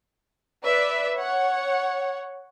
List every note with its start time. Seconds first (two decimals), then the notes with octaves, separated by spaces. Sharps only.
0.63 B4 D5 E5
1.16 C#5 F#5